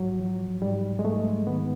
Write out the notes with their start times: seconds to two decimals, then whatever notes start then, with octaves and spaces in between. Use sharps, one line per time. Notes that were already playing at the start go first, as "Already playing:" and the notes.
Already playing: G#2 F#3
0.20 F3
0.62 G#2 G3
0.99 G#3
1.05 G#2 A3
1.47 D#3 B3